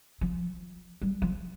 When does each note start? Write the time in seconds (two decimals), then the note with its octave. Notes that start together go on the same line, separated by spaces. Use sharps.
0.21 F3
1.02 G3
1.22 F3